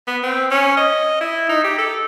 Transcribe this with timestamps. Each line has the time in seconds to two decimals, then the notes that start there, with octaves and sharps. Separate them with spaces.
0.07 B3
0.23 C4
0.51 C#4
0.77 D#5
1.20 E4
1.49 D#4
1.64 G4
1.78 A4